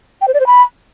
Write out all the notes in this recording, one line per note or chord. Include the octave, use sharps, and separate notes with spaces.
G5
C5
D5
C5
B5